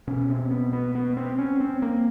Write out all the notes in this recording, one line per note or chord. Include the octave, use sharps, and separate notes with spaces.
B2 C#4
C4
B3
B3
B3
C4
C#4
C4
A#3